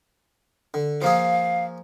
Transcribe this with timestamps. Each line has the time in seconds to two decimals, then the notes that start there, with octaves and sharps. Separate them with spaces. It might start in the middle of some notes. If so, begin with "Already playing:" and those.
0.74 D3
1.02 F3 A#3 G#4 F5